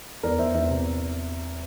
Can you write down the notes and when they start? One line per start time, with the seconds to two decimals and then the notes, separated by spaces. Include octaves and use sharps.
0.23 E2 A#4 D5
0.38 E2 C5 E5
0.54 E2 C5 E5
0.70 C3